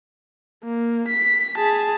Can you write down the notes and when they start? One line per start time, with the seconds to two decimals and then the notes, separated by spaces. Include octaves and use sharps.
0.64 A#3
1.08 B6
1.58 G#4 A5